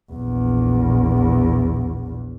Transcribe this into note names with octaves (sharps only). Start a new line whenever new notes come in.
A#1 E2